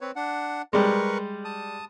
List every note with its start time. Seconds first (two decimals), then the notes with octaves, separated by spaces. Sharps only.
0.01 C4 B4 C#5
0.16 D4 F#5
0.73 G3 G#3 A#4 B4 C#6
1.45 A5 D#6